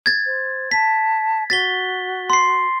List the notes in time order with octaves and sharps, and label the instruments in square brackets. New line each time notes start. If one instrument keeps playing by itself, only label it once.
[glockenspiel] G#6 A6
[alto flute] C5
[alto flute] A5 [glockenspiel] B6
[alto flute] F#4 [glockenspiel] A6 B6 G7
[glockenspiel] C6 C7